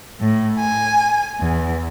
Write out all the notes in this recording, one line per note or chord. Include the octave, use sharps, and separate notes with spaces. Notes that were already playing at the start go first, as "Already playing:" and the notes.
A2
G#5
E2